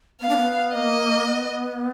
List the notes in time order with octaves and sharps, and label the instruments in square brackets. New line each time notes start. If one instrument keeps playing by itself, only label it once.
[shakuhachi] B3 [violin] F5
[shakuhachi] D4
B3
[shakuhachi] A#3 [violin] D#5
[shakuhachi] B3